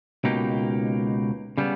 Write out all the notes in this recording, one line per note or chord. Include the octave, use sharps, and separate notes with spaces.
C#2 B2 A#3 D#4 G4
C#3 G3 B3